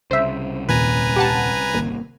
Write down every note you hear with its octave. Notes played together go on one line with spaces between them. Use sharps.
C2 C#3 C5 E5
D#2 A#2 B4 G#5 A#5
G4 F#5 A5
G#1 A#3